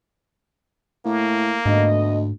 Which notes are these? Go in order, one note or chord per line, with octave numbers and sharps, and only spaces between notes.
A2 A#3
D2 G#2 A3 B3 D#5